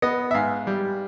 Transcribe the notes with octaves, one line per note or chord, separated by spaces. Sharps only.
B3 D#5
E5
G#2 F5
G3